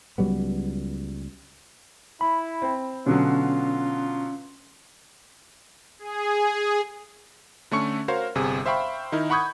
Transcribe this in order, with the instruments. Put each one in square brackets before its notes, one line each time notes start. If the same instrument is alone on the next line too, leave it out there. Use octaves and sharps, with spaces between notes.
[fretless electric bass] C#2 F#3 G3 B3
[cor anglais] E4 [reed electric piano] B5
[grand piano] C4
[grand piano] B2 D3 F#3 [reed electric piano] C#4 [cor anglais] F4
[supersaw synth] G#4
[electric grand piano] D3 A3 C#4 C#6 C#7
F#4 A#4 C5 C#5 F5 F6
G1 C3 G#4
C5 E5 F5 G5 B5 C#6
D#3 D#4 E4 A#4
F#5 B5 C#6 D#6 G6 G#6